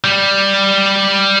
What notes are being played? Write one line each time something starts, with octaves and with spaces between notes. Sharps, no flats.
G3